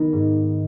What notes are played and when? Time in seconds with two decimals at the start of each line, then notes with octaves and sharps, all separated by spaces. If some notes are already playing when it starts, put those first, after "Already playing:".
Already playing: D#3 B3 D#4
0.13 G#2